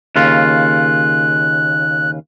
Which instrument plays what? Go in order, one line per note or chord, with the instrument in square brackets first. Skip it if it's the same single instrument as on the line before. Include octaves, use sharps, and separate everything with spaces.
[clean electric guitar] D#2 C#3 F4 [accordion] F#6